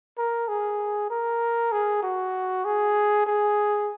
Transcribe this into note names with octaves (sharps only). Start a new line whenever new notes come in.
A#4
G#4
A#4
G#4
F#4
G#4
G#4